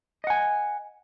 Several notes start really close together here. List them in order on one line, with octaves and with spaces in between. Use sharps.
D#5 F#5 G#5